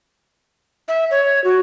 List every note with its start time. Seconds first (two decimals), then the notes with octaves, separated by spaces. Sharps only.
0.88 E5
1.11 C#5
1.44 F#4